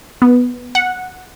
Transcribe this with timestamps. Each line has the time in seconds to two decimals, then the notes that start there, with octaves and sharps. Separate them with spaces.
0.22 B3
0.75 F#5